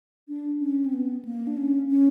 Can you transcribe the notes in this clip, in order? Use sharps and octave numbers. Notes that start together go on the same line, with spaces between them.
D4
C#4
C4
B3
A#3
D4
C#4
C#4